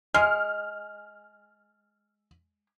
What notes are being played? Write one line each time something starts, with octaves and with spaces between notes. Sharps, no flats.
G#3 F6